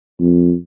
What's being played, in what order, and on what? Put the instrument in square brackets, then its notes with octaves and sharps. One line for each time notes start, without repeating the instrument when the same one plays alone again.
[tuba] F2